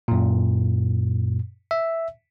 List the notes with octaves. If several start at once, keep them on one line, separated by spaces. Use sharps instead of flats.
F#2 A#2
E5